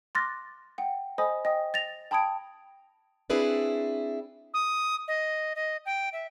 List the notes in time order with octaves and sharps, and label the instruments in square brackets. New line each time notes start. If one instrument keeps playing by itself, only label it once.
[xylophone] C6 D6 F6 F#6 A6 A#6
F#5 G5
A4 C5 D#5 G#5 B5 D#6
D#5 G5 D#6
A6 A#6 F7
G5 A5 B5 D#6 G#6 D7
[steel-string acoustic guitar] C4 D4 E4 G#4 B4 D5
[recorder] D#6
D#5
D#5
G5
E5